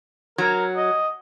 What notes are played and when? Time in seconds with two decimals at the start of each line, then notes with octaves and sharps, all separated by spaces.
0.38 F#3 A#4
0.76 D#5